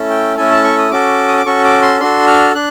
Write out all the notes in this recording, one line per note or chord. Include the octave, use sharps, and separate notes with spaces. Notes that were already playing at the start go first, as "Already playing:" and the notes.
Already playing: A3 C#4 E4 A4
G5
A3 C#4 E4 A4 G#5
A5
C#6
D#6
C#4 F#4 A4 D6
D#6
D6
C#4 F#4 A4 C#6
D6
C6
D4 F#4 A4 C6
F6
D4 F#6